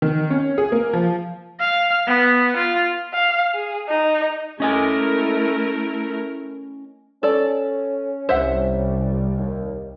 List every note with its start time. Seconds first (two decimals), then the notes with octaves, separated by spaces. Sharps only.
0.02 D#3
0.30 C#4
0.58 G#4
0.72 A#3
0.93 F3
1.60 F5
2.07 B3
2.57 F4
3.13 F5
3.55 G#4
3.89 D#4
4.60 A3 C#4 E4 A#4 D#5 G#5
7.23 C#4 A4 D5
8.29 C2 G3 C5 E5 F#5
9.38 D#2